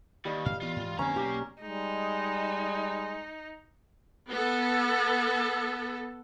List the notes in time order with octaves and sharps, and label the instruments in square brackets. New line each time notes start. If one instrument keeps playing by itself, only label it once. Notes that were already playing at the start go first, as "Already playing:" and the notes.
[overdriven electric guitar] D#2 [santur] G3 D#5
[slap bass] A2 [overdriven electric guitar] F5
[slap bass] E3 B3 [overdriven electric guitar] F4
[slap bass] G#2 E3
[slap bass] F2 D3 C4 [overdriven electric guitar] A#3 A#5 [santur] C#4
[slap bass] B1 [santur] G4
[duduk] G3 [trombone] G#3 [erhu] D#4
[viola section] B3 A4